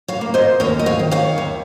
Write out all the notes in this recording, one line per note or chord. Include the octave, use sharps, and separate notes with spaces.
C#5 F5
A#3
C5 D#5
D#2 A#4 C#5
D#5
C#5 F5
D#3
C#5 F5
D#2